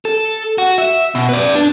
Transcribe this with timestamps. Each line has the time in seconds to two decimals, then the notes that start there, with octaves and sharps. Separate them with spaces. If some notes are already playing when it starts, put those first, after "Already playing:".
0.05 A4
0.58 F#4
0.78 E5
1.15 B2
1.29 B4 D5
1.55 D4